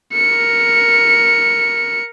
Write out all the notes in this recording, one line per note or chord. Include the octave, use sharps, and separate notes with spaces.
A#4 C#7